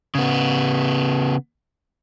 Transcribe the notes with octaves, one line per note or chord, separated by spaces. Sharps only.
C#3 B3